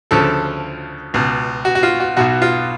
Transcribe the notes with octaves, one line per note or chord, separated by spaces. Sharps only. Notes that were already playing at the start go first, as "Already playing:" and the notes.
D2 C#3 F3 A4
C#2 B2
F#4
F#4
F4
F#4
B1 B2 F#4
F4